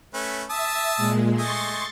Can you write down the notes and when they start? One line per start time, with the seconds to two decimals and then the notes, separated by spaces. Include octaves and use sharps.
0.14 A3 C#4 B4
0.50 E5 A5 D#6 E6
0.97 A#2 G#3
1.38 A3 D#5 G#5 C6 C#6 A6